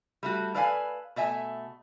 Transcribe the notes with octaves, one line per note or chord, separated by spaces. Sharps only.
G3 A3 F#4
A4 B4 D5 F5 F#5 G#5
B2 A3 E5 G#5